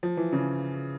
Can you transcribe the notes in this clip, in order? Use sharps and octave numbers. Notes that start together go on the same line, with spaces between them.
F3
E3
C#3